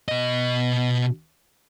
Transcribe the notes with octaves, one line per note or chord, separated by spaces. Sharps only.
B2 D#5